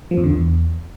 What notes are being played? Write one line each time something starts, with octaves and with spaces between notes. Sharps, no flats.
F3
F2
D3
E2